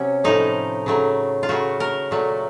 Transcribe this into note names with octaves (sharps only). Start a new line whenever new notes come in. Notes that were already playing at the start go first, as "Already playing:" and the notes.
Already playing: C3 F#3 C#4
A2 F3 A3 D#4
C#3 F#3 A3
F4
C#3 F#3 A3 F#4
A#4
A#2 F#3 A3